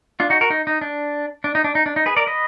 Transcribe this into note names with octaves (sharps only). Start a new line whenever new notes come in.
D4 F4
D#4 F#4
F#4 A#4
D#4
D#4
D4
D4
D#4
D4
D#4
D4
D#4
G#4 B4
A#4 D5
B4 D#5